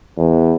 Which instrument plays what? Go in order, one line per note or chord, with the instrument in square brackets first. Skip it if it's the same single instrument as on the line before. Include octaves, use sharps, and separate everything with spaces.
[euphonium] E2